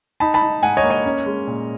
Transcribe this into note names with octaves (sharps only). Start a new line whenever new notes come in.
D#4 A5 B5
A5 B5
D#4
G#2 F#5 G#5
C#5 D#5
A#3
C#5 D#5
C#4
G#3
A#2